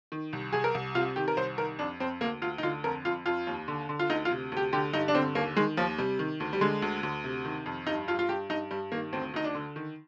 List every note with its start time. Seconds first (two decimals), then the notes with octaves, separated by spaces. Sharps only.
0.12 D#3
0.33 C2
0.53 C2 G#4
0.64 A#4
0.75 C2
0.95 C3 F4
1.16 D#3 G4
1.28 A#4
1.37 C2 C5
1.58 D#3 A#4
1.79 F2 D4
2.00 F2 C4
2.21 D2 A#3
2.42 D2 F4
2.58 D#4
2.63 D3 F4
2.84 F2 A#4
3.05 F2 F4
3.26 F2 F4
3.47 D#2
3.68 D3
3.89 D3
3.99 F4
4.10 D2 D#4
4.25 F4
4.31 C3
4.52 D2 G4
4.73 D3 G4
4.93 G2 D#4
5.08 D4
5.15 D3 C4
5.35 D#2 A#3
5.56 D#3 G#3
5.77 D#2 F3
5.98 C3 G3
6.19 D#3
6.40 D2
6.53 G3
6.61 D3 G#3
6.82 D2
7.03 D2
7.24 C3
7.45 D#3
7.66 F2
7.87 G2 D#4
8.08 G2 F4
8.19 F4
8.29 G2 G4
8.49 G2 D#4
8.71 G2 G3
8.92 D#3 A#3
9.13 D2 C4
9.34 D2 D#4
9.44 D4
9.55 D3
9.76 D#3